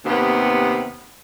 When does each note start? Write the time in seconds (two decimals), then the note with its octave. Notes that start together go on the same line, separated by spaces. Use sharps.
0.06 D#2 C3 B3